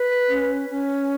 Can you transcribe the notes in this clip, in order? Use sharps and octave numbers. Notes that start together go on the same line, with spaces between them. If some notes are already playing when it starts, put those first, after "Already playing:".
Already playing: B4
C#4
C#4